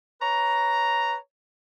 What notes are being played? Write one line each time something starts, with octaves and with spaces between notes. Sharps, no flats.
B4 C#5 A#5